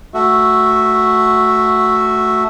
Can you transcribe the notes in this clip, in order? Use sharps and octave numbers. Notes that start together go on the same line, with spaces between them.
A3 F#4 E5